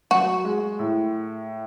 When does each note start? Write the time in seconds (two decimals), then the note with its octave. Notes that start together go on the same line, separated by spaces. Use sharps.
0.11 F#3 F#4
0.45 G#3
0.79 A2